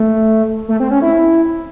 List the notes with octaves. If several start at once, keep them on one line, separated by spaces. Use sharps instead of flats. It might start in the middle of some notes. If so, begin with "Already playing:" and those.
Already playing: A3
A3
C4
C#4
E4